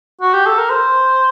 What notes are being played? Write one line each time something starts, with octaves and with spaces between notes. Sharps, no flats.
F#4
G4
A4
A#4
C5